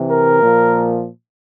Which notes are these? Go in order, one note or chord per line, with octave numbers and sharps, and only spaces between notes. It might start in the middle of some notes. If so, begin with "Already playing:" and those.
Already playing: C3 E3
A#4
A#2 F3